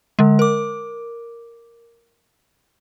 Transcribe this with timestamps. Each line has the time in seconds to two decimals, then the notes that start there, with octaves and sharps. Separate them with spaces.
0.19 D3 G#3
0.39 A#4 D6